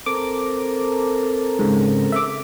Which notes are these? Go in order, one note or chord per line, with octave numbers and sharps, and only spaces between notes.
C4 A4 A#4 D6
G#2 C#3
E5 D6